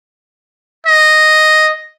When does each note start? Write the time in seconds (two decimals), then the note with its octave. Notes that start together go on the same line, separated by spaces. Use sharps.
0.86 D#5